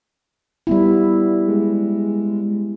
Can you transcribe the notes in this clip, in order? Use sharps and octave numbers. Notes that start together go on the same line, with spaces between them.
G3 B3 E4
G#3